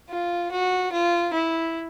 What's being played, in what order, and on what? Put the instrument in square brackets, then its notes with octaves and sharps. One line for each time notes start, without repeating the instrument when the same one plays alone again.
[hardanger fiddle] F4
F#4
F4
E4